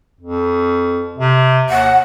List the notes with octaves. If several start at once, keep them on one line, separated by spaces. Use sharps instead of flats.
F2
C3
D#2 F#5